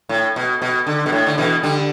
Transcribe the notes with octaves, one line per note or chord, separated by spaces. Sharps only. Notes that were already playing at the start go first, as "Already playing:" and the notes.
A2
B2
B2
D3
B2
A2
D3
B2 E3
D3 G3